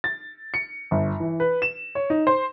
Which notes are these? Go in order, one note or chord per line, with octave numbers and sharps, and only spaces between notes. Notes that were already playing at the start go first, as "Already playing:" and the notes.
A6
C#7
G1
E3
B4
E7
C#5
D#4
C5